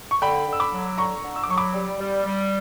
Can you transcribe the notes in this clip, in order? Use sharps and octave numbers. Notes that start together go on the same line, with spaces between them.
C#6
D3 G5 B5
D3
E6
B5 D6
F#3
D3 A#5 C#6
D3
E6
D6
F#3 C#6
B5 D6
G3
G3
G3